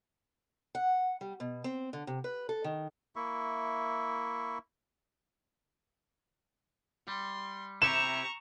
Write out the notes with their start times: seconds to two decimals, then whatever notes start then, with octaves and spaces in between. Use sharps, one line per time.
0.75 F#5
1.21 G3
1.40 B2
1.64 C4
1.93 D3
2.07 C3
2.24 B4
2.49 A4
2.64 D#3
3.16 A#3 E4 E5 C#6
7.08 G3 C6
7.82 C3 E4 G4 A#5 C#6 E7